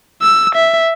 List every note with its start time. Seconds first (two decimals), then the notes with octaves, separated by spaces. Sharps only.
0.22 E6
0.56 E5